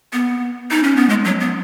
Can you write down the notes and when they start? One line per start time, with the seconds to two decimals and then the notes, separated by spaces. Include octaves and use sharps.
0.13 B3
0.71 D#4
0.83 C#4
0.96 B3
1.09 G#3
1.24 F#3
1.41 B3